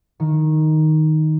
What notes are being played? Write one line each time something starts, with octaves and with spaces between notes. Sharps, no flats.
D#3